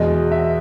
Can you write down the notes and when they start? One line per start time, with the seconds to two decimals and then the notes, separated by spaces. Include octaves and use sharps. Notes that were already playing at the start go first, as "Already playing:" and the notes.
Already playing: E2 B2 G#3 D#5
0.32 E5